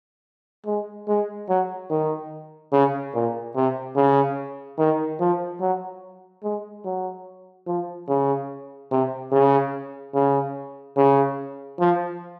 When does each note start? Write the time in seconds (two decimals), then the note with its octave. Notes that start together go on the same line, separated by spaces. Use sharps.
0.66 G#3
1.08 G#3
1.49 F#3
1.90 D#3
2.72 C#3
3.14 A#2
3.55 C3
3.96 C#3
4.78 D#3
5.20 F3
5.61 F#3
6.43 G#3
6.85 F#3
7.67 F3
8.08 C#3
8.91 C3
9.32 C#3
10.14 C#3
10.97 C#3
11.79 F3